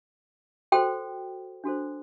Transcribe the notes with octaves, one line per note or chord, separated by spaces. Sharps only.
F#4 A4 C5 G5
D4 F#4 A4 C5